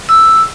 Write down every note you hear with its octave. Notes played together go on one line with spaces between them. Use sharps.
E6